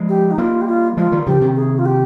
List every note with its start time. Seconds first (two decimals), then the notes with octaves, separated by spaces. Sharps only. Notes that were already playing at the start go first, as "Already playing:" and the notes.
Already playing: F3 G#3
0.09 G4
0.31 D#4
0.38 G3 A#3 F4
0.61 G4
0.67 F4
0.97 F3 G#3 F4
1.12 D#3 G3
1.27 C#3 F3 G4
1.41 C3 D#3
1.56 G#4
1.79 F4
1.85 G4